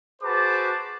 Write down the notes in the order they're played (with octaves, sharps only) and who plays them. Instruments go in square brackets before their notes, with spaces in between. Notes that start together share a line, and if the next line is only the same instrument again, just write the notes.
[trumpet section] F#4 G#4 B4 C5 A5 D6